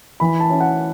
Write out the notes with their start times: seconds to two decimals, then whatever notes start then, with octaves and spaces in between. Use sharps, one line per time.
0.20 E3 B5
0.40 A5
0.50 C#4 E4
0.60 F#5